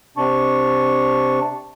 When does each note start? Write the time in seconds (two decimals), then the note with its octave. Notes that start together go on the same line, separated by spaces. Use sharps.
0.17 C3 D4 A5 C#6